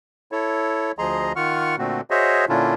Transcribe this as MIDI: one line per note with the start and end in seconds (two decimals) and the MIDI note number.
0.32 0.92 64
0.32 0.92 69
0.32 0.92 73
0.99 1.32 38
0.99 1.32 53
0.99 1.32 68
0.99 1.32 75
0.99 1.32 82
0.99 1.32 84
1.36 1.76 51
1.36 1.76 65
1.36 1.76 78
1.36 1.76 85
1.36 1.76 89
1.78 2.01 46
1.78 2.01 50
1.78 2.01 57
1.78 2.01 60
1.78 2.01 66
2.10 2.45 66
2.10 2.45 68
2.10 2.45 72
2.10 2.45 73
2.10 2.45 75
2.10 2.45 76
2.49 2.74 46
2.49 2.74 50
2.49 2.74 61
2.49 2.74 62
2.49 2.74 64
2.49 2.74 65